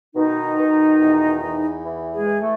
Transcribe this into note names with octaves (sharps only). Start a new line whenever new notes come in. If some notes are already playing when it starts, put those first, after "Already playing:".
B2 D#3 D#4
B2
E2
E2
E3
G#3 G#4
E3
A3